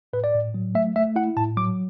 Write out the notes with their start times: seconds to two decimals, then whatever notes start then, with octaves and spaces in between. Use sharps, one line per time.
0.13 A2 B4
0.24 D5
0.34 A2
0.54 F#3
0.75 A3 E5
0.96 A3 E5
1.16 E4 F#5
1.37 A2 A5
1.57 F#3 D6